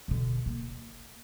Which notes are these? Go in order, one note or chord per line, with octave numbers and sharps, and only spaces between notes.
B2 D3
A#3